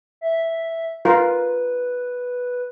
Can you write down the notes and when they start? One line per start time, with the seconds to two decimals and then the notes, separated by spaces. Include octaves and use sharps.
0.21 E5
1.05 F4 A#4 B4